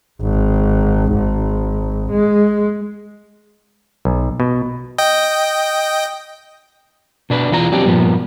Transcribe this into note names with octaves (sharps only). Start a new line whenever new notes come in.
G#1
G#1
G#3
B1
B2
D#5 G5
B2 D4 B4
E2 E3 F4 A#5
F#3 C4 D4 G4
G2 A#2 F3 B3